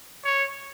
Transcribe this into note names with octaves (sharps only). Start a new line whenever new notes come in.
C#5